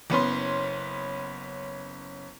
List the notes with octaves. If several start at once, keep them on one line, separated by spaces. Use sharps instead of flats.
F#1 B3 C#4 C6